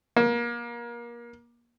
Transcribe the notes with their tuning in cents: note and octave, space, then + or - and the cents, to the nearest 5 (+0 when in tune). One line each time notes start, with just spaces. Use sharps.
A#3 +30